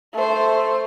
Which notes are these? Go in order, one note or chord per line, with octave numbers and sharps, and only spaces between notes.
A3 C5